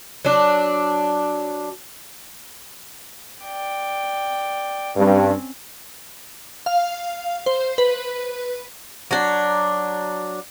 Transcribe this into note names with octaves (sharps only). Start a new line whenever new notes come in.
F#3 D4
D5 G5
G2 C4 C#4
F5
C5
B4
F#3 D4